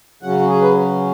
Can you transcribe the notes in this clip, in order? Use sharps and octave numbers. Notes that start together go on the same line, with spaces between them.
C#3 F#3 C#4 F#5
F#4
G#4
B4